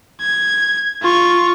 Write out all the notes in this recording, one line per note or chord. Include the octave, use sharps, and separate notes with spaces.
G#6
F4 C#6